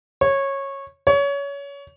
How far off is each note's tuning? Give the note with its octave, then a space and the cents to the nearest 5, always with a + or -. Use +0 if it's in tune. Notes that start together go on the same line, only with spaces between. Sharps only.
C#5 -15
C#5 +25